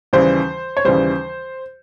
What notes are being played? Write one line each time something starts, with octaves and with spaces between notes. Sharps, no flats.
D#2 C#3 E3 G3 C5
C#5
D#2 C#3 E3 G3 C5